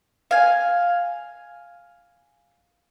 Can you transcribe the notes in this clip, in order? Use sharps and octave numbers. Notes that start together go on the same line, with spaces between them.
F5 G#5